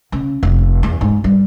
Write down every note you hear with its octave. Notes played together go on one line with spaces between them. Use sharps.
C#3
F1
E2
G#2
G3